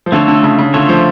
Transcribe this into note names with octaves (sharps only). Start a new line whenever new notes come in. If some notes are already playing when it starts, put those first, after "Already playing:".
F3
D3 A3 F4 A4 C#5
D3
C#3
C#3
D3 A3 F4 A4 C#5
F3